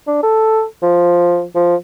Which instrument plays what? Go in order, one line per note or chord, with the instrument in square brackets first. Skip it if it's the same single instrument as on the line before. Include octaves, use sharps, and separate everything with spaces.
[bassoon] D4
A4
F3
F3